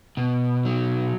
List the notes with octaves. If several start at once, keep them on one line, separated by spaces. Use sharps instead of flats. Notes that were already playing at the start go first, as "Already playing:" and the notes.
B2
F#3